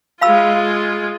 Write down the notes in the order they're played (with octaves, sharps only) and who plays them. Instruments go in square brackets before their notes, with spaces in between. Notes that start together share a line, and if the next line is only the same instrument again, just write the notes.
[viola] G#3 F4 [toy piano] F5 B5 E6